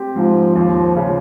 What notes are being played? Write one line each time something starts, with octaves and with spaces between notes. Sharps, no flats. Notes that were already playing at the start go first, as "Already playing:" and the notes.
Already playing: C4 G4
G#2 F3
D#2 F3
C#3